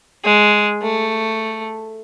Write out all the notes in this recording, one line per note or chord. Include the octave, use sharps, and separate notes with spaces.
G#3
A3